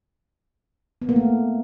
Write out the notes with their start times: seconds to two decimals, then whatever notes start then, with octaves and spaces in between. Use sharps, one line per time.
1.02 B3
1.09 A#3
1.16 A3